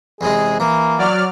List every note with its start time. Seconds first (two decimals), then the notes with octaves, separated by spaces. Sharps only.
0.21 E2 C3 G#3 G#4
0.60 E3 A#3
0.98 F#3 D5 F6